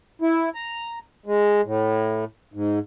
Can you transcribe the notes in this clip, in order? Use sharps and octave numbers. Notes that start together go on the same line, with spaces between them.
E4
A#5
G#3
A2
G#2